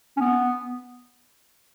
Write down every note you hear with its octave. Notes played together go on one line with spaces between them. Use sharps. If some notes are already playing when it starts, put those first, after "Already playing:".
C#4
B3